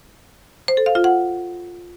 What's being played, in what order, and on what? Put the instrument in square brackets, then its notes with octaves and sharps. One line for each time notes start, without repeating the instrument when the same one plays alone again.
[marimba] C5
A4
F5
F4
F#5